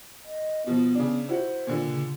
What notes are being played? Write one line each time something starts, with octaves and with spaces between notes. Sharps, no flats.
D#5
B2 F3 B3
C#3 D4
E4 F#4 C5
A#2 D3
C#3